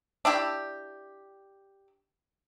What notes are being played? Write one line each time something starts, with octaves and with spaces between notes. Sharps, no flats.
D4 E4 G4